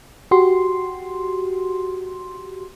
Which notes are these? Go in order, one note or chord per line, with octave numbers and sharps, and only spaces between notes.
F#4 G4 C6